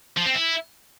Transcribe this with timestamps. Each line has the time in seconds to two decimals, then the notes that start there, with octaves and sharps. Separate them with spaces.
0.17 F3
0.26 C4
0.34 E4